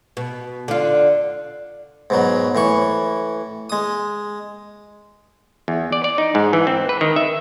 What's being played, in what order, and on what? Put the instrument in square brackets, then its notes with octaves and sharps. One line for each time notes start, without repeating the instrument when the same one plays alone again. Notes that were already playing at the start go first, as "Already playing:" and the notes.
[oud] B2
D3 F4
[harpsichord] G#2 B2 F#3
A2 E3 C#6
G#3 D#6
[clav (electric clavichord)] E2
D5
D5
D#4
G#2
E3
C4
B4
D#3
E5